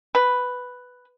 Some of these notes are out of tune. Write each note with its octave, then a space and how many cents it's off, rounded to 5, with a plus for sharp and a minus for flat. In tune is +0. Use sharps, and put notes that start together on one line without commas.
B4 +5